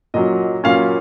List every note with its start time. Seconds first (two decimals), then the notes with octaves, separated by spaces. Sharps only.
0.14 A#2 F#3 C#4 D#5
0.64 A#2 F#3 C#4 F5